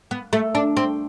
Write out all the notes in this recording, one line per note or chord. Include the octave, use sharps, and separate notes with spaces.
B3
A3
D4
C4